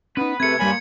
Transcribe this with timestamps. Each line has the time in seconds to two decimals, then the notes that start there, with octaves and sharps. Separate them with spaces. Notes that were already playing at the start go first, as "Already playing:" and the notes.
0.17 B3 C#4 D#4 B4
0.40 C3 A3 C4 G#4 A#4 G#6 C#7
0.59 G2 A#2 G3 A#4 C#5 G#5 B5